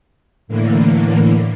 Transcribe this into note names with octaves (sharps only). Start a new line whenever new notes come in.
A2 D3 E3 A#3